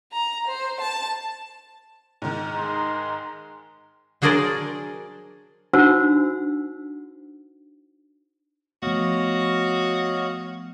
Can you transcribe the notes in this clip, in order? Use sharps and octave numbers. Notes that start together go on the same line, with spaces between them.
A#5
C5
A5
G#2 D#3
G#3 A#5 C6
F#3 D4 G#4 A#4 C5 D5
D4 D#4 F#4 C5 F#5 E6
F3 A3 B3 F#4 C#5 D#5 F5